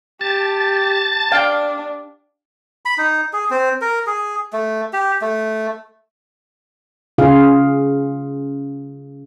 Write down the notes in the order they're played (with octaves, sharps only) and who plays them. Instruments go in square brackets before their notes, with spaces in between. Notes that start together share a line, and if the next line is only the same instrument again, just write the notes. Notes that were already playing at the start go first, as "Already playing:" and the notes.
[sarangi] G4 [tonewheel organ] A5 A6
[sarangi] D4 [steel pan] F5 G5
[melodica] B5
D#4
G#4
C4
A#4
G#4
A3
G4
A3
[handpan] C#3 F4 G#4 F5